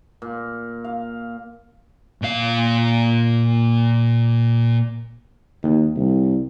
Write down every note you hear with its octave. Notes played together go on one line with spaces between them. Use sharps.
A#2
F5
A#2 F5
D#2
C2